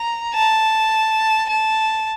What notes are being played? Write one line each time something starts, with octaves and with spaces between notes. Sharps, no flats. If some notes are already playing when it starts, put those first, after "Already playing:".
Already playing: A#5
A5
A5